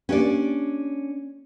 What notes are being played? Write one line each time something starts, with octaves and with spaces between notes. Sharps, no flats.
A#3 C#4 D4 G4 D5 F5